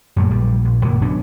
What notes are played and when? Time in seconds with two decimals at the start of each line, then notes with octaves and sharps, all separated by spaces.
0.16 F#2 A#2 F#3 A3
0.30 A#1 G3
0.65 A#1
0.85 F#2 A#2 D3 E3
1.02 B2 F#3 C#4 D4